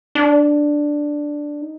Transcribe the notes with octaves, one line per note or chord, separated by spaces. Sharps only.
D4
D#4